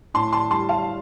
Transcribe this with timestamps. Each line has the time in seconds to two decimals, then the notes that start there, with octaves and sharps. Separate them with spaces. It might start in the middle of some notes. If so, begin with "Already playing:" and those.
0.14 A2 A5 C6
0.33 A5 C6
0.51 G3 A5 C6
0.69 F5 A5